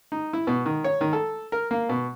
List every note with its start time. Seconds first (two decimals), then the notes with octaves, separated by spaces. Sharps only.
0.12 D#4
0.33 E4
0.47 B2
0.66 D#3
0.84 C#5
1.01 D#3
1.13 A4
1.52 A#4
1.71 A#3
1.89 B2